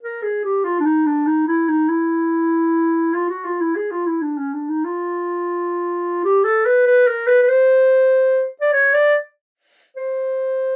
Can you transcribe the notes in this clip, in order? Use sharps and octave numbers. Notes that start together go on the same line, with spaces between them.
A#4
G#4
G4
F4
D4
D#4
D4
D#4
E4
D#4
E4
F4
F#4
F4
E4
G#4
F4
E4
D4
C#4
D4
D#4
F4
G4
A4
B4
B4
A#4
B4
B4
C5
D5
C#5
D5
C5